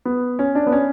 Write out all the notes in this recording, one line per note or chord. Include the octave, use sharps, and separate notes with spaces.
B3
C#4
D4
B3
C#4